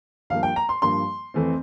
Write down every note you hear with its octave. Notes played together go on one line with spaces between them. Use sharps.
G2 F3 A#3 F5
G5
A#5
C6
G2 F3 A#3 C6
F2 E3 A3 C4